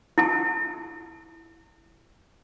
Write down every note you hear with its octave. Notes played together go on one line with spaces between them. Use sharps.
E4 A5